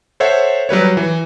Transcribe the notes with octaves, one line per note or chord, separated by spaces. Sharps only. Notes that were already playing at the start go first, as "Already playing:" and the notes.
A4 C5 C#5 E5 F#5
F#3 G3 B4 C#5
E3